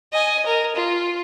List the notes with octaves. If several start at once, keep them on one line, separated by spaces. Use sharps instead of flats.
D#5 G#5
A#4
F4